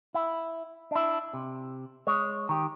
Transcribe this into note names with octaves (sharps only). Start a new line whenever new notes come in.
E4
D4 E4
C3
G#3 C#5
D#3 G4